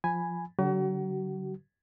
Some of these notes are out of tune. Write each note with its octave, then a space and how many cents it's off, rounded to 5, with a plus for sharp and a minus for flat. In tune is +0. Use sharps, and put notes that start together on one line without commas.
F3 +0 G#5 +0 B5 +0
D3 -35 F#3 +25 F#4 +40